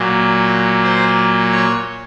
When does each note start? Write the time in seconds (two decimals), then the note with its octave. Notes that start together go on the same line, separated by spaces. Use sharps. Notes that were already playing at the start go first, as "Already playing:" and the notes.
Already playing: A#2 F#3
0.83 C5
1.52 C#5